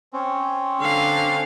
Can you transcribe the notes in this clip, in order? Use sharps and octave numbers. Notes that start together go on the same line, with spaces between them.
C4 C#4
D3 F5